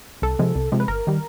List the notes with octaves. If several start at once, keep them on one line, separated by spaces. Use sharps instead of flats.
C2 A4
C3 F3 G#3
C2
C3 F3 G#3
B4
G1 A#4
D#3 G3